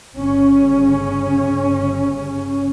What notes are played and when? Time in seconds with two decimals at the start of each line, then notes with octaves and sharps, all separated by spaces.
0.16 G1 C#3 C#4